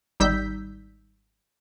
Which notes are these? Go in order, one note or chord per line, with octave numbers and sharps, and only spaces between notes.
G#1 G3 D#4 E6 G6 B6